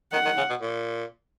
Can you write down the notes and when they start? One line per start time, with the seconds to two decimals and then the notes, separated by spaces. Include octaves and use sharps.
0.12 D#3 F#5
0.25 D#3
0.37 C#3
0.50 B2
0.61 A#2